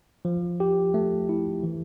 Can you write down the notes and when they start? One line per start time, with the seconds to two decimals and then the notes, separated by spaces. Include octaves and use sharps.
0.25 F3
0.60 G4
0.94 A3
1.29 E4
1.63 E3